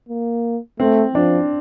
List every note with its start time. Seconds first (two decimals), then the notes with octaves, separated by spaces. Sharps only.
0.09 A#3
0.80 A3 C4
1.15 F3 D4